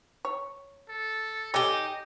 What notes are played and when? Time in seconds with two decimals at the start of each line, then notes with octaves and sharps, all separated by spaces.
0.25 C#5
0.89 A4
1.54 D#4 G4 A4 C#5 D#5 G#5